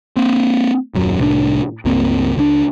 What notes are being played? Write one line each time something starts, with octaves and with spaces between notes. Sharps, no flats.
A#3 C4
D#1 F#2 F#3
C2 A2 A3 D4
C#2 G2 A#3 C4
C#2 G3 D4